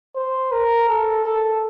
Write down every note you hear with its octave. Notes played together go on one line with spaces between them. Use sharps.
C5
A#4
A4
A4